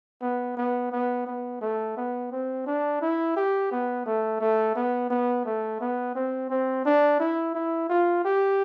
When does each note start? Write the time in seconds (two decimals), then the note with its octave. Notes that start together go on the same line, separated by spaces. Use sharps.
0.22 B3
0.57 B3
0.92 B3
1.27 B3
1.61 A3
1.97 B3
2.31 C4
2.66 D4
3.01 E4
3.36 G4
3.71 B3
4.06 A3
4.40 A3
4.76 B3
5.10 B3
5.45 A3
5.81 B3
6.15 C4
6.50 C4
6.85 D4
7.20 E4
7.55 E4
7.89 F4
8.25 G4